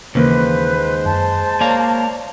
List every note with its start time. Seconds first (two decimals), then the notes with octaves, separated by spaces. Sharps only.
0.15 D#2 C#3 E3 G#3 A#3 B4 C5
1.05 F#2 A5
1.61 A#3 C#5 D5 F5